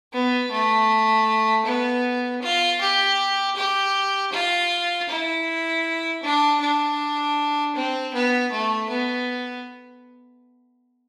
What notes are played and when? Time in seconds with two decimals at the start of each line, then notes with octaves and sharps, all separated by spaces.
0.13 B3
0.51 A3
1.66 B3
2.42 F4
2.81 G4
3.56 G4
4.32 F4
5.09 E4
6.23 D4
6.61 D4
7.75 C4
8.14 B3
8.52 A3
8.90 B3